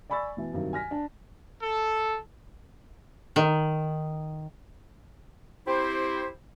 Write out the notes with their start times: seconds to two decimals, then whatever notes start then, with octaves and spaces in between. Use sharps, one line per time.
0.10 D5 G#5 B5 C#6 E6 A6
0.37 B2 E3
0.53 G2 C3 D#3 F#3
0.73 G#5 F6 A#6 B6
0.91 D4 A5
1.61 A4
3.36 D#3
5.67 C4 E4 G4 C5